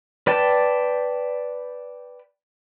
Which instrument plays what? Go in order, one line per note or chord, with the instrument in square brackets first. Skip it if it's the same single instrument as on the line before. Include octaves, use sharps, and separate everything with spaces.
[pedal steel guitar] B4 D5 G5 A5